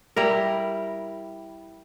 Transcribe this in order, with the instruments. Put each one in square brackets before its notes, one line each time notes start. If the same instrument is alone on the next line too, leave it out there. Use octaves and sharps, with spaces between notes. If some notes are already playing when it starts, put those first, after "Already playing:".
[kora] G3 E4 A#4